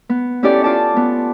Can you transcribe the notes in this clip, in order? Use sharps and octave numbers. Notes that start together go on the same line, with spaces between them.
B3
C#4 E4 G4 A4 C#5 D5
F4 D5 A5
B3